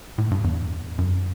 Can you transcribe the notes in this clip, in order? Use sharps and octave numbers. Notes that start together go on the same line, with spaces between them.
A2
G2
E2
F#2